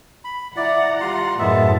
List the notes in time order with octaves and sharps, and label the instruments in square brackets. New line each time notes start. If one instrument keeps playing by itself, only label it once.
[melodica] B5
[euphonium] E4 [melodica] D5 [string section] F#5 A#5
[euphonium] G3 [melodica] F4 C6
[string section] F#2 A2 A5 [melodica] G#3 B3 E5 [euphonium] E4